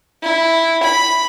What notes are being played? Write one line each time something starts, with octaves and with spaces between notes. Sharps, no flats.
E4
B5